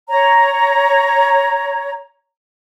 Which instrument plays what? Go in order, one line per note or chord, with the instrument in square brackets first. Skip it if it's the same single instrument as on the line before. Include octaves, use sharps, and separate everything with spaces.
[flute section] C#5 A#5